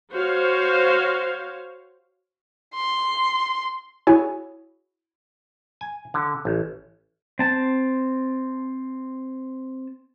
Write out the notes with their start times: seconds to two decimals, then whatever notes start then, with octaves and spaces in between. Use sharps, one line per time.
0.12 F#4 C5 C#5 F5
2.75 C6
4.07 E4 F#4 G#4 C#5 G#5
5.81 G#5
6.14 D3
6.45 A1
7.39 C4 A5